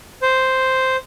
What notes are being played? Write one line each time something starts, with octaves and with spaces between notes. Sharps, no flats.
C5